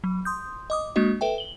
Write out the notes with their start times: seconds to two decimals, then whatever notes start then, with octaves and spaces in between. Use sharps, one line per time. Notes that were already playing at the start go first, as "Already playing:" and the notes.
0.04 F#3
0.25 C6 D#6 G6
0.70 D#5 D6 D#6
0.96 G#3 A#3 D4 F#4 D#5
1.21 A4 B4 E5 G5
1.38 F#7 G7